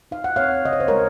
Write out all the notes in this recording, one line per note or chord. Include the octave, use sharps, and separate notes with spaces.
D#4 F5
F#5
C4 C#5 F5
C#3 D#5
C#5
C5
G#3 A#4 C#5